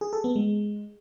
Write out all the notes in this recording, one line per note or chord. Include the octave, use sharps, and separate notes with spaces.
G#4
A4
B3
G#3